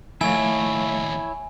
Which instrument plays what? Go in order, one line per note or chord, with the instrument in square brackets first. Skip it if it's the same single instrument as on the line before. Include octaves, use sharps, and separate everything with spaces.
[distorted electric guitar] D#2 A2 [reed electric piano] F3 A3 F5 [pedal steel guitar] E4 C#5 [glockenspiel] G#5